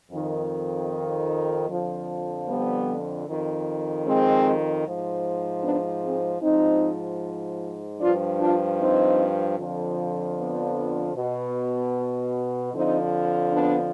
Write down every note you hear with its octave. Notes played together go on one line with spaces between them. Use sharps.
F2 D#3
F2 D3 F3
G3 B3
F2 D#3
G#3 C4
G#2 F3
B3 D4
G#3 C4
G#2 F3 C4 D#4
G2 F3 D4 F4
D4 F4
C4 D#4
F2 D3 F3
B3 D4
B2
F2 D3 F3 C4 D#4
B3 D4